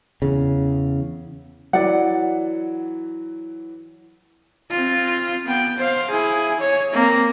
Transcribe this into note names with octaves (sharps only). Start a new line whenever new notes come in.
E2 C#3
E3 F#3 D5 F#5
C4 F4
B3 G5
C5 F5
E4 G#4
C#5
A#3 C4